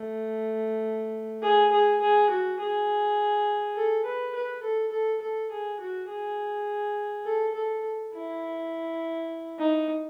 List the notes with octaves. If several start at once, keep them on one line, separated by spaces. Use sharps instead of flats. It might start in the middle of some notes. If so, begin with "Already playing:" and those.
Already playing: A3
G#4
G#4
G#4
F#4
G#4
A4
B4
B4
A4
A4
A4
G#4
F#4
G#4
A4
A4
E4
D#4